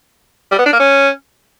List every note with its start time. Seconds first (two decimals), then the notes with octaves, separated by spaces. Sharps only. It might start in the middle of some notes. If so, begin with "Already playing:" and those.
0.52 G3
0.59 B3
0.66 D4
0.73 A#3
0.80 C#4